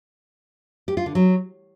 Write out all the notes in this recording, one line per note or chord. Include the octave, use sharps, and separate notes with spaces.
G4
F4
D3
F#3